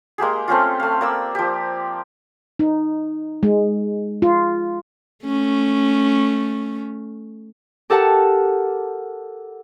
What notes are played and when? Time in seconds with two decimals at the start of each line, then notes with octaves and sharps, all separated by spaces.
0.18 G#3 A#3 G4 G#4
0.48 A3 C4 C#4 F4
0.80 A3 F5
1.01 A#3 D5 E6
1.35 F3 G4
2.59 D#4
3.43 G#3
4.22 F4
5.26 A3 C#4
7.90 G4 A4 A#4 F#5 A5